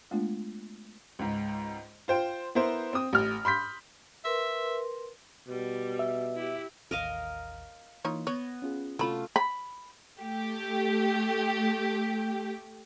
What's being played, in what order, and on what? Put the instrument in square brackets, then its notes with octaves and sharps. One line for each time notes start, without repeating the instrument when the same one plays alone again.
[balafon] G#3 A3 B3 D4 F4
[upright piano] C#2 G#2
F4 C5 G5
B3 E4 A#4 C5
C4 D#6
A1 F6
B5 C6 G6 B6
[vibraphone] A#4 B4 C6 [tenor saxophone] E5
[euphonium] B2 [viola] G3
[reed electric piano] E5
[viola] E4 G4
[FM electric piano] A1 D#2 [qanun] A#4 D#5 F5
[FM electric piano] E3 A#3 [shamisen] D#4 F4 C#5
[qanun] B3 [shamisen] C#5 [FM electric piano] G#6 A#6
[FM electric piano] C#4 F4 G#4
[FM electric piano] C3 C#4 [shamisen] F#3 B5 [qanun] A3 F4
[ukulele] B5
[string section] A3 G4